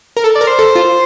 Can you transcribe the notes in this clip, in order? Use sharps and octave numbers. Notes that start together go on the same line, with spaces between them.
A#4
A4
D5
A#4
C5
A4
F4